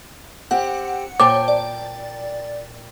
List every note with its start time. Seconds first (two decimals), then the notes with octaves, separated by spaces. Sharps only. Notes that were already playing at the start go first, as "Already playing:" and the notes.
0.51 C4 G4 F#5
1.20 A#2 C5 C#5 G5 A5 D6
1.48 D5